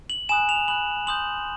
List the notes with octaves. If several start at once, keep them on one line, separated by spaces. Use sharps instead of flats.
F#7
G#5 B5 D#6 F#6 E7
F7
B5 D#6 F#6 F#7
C6 D#6 G6 F#7